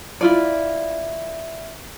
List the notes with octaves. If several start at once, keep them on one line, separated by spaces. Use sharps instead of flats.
E4 F4 D5